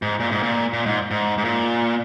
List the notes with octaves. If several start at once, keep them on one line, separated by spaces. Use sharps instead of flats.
G#2
A#2
G#2
A#2
A#2
G#2
G#2
G#2
A#2